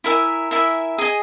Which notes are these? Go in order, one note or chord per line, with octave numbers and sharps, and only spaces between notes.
E4 A#4 E5 G#5
E4 A#4 E5 G#5
G#4 D#5 G#5